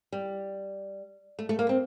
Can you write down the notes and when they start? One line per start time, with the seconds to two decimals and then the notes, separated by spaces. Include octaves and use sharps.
0.12 G3
1.39 A3
1.49 A3
1.59 A#3
1.69 C4